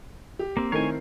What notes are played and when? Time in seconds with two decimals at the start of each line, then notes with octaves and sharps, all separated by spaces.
0.39 G4
0.57 A#3 C4
0.72 D#3 A3 C4 E4 A#4 C#5 G#5 C7